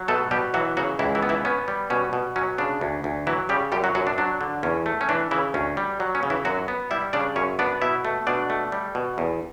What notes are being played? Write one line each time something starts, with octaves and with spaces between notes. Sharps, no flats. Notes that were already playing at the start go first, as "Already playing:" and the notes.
Already playing: F#3
B2 A3 A4
B2 G3 G4
E3 F#3 F#4
C#3 F#3 F#4
C#2 E3 E4
E3 E4
B3
E3 E4
B3 C#4
G3
B2 C#4
B2
F#3 C#4
C#3 D4
D2
D2
E3 F#3 E4
C#3 G3 G4
F#2 G3 G4
F#3 F#4
F#2 F#3 F#4
D4
F#3 D4
D3
E2 C#4
A3
C#4
E3 D4
C#3 E3 E4
D2 C#4
G3
F#3
C#4
C#3
E3 E4
F#2 F#3 F#4
B3
G3 E4 E5
C#3 D4 D5
F#2 C#4 C#5
B3 D4 D5
B2 E4 E5
A3
B2 D4 D5
A3
G3
B2
E2